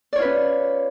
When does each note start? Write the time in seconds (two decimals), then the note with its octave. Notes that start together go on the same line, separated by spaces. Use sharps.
0.13 D5
0.16 C#5
0.19 F4
0.22 B4
0.25 C#4